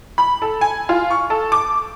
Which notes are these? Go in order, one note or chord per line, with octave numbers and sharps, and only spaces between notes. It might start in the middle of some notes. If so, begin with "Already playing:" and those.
B5
A4
G#5
F4
C#6
A4
D6